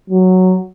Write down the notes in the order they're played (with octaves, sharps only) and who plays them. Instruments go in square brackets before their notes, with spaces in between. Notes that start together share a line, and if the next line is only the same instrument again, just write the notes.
[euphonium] F#3